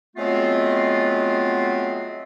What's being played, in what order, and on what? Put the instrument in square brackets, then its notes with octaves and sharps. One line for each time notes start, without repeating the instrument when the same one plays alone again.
[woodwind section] F#3 G#3 A3 B3 C4 F4